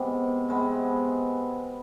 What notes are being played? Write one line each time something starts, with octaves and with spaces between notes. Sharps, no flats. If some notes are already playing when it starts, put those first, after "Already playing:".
Already playing: C3 G#3 B3
C3 G#3 B3